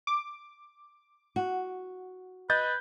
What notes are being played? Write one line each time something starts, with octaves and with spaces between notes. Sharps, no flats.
D6
F#4
B4 D#5 G6 A6